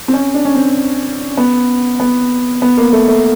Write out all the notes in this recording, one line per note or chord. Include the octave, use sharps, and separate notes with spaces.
C4
C#4
D4
C#4
C4
B3
B3
B3
A#3
A3
A3